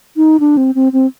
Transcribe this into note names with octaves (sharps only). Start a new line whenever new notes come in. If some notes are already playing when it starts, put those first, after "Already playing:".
D#4
D4
C4
C4
C4